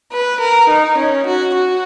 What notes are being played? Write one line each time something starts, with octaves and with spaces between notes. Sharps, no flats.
B4
A#4
D#4
C#4
F#4
F#4